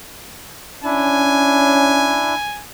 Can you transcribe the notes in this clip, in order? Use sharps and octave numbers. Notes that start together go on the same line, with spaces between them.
C#4 D4 E4 G#5